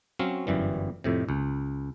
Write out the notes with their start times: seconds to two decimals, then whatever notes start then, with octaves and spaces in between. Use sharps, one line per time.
0.19 F#3 C4 C#4 F5
0.47 G1 F#2 E3 G3
1.04 F2 A2 C3
1.29 C#2